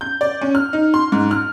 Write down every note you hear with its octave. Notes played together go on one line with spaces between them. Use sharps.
G6
D5
C#4
F6
D#4
C6
G#2
F6